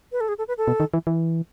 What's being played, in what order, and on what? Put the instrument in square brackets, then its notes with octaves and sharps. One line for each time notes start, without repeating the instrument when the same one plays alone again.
[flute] B4
A4
G#4
A4
B4
A4
[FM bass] B2
D#3
E3
E3